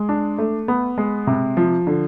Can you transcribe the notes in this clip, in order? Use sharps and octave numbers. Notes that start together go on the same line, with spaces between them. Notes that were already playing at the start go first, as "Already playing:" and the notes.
Already playing: G#3
D4
A3
B3
G#3
C3
F3
D3